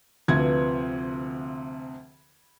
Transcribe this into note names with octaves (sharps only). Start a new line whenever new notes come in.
D2 C3 F3 B4 G#6